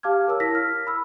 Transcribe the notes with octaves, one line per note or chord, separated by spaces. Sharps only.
G4 F5 A5 D6 F6 G#6
A#4 C#5 A5 E6
E4 A#4 E6 A#6 B6
F6
B5 E6